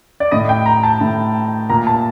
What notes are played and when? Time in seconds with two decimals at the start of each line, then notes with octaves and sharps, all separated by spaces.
0.20 D5
0.32 A2 D#5
0.49 G5
0.66 A#5
0.83 A5
1.01 A2
1.69 A#2 A#5
1.87 A5